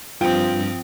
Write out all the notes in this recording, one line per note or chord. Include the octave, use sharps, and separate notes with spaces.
G2 F3 C4 F4 G5 D#6